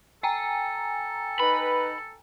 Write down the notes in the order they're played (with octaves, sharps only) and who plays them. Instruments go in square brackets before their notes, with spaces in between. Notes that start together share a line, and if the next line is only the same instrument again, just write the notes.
[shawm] A4 [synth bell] G5 G#5 A#5
[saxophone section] D#4 B4 [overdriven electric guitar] B5